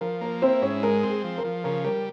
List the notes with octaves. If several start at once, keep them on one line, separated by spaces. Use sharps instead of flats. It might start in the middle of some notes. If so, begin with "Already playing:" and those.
F3 A#4
A#3 A#4
C4 E4 C5
G#2 C#4 C#5
G#3 A#4
C4
G#4
F3
A#4
F3
C#3 A#4
G3 A#4